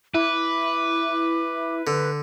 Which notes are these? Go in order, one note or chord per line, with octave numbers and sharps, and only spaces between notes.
E4 B4 D6
D3 B4